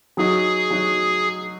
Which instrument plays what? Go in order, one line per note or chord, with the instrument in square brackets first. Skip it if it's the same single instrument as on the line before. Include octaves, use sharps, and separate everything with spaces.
[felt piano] F#3 D#4 F#4 [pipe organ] G#4
[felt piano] F#3 D#4 F#4